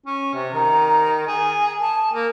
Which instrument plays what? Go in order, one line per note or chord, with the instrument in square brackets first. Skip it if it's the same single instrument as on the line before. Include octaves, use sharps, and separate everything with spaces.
[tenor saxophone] C#4
C3
[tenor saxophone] D#3 [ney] A#5
[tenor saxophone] G#4 [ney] G#5
[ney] A5
[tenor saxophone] A#3